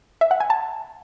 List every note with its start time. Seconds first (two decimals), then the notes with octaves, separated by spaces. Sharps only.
0.21 E5
0.31 F#5
0.40 G#5
0.50 A5